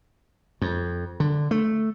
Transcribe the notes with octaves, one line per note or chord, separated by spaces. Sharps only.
F2
D3
A3